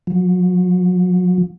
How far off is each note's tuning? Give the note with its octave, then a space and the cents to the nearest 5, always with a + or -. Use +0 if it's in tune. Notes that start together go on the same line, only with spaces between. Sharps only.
F#3 -40